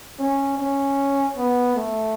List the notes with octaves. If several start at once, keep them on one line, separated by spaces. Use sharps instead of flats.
C#4
C#4
B3
A3